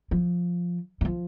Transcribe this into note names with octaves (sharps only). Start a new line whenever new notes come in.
F3
G3
F3